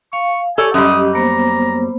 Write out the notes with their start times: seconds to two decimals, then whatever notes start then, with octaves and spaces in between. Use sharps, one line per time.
0.13 F5 C#6
0.58 G4 A4 C#5 D5 G#5 C#6
0.74 F#2 G3 C#4 G4 D#5 D#6
1.15 A#3 B3 C5 A#5